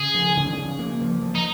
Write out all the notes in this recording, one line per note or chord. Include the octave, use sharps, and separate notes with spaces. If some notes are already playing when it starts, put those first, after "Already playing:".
Already playing: C#3 G#4
F3
C#3
C#3
A#3
F3
F3
D#4